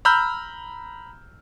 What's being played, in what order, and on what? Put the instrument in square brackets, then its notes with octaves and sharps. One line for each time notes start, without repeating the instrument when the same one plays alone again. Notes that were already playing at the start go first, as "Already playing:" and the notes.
[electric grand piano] A#5 B5 E6 F6 G6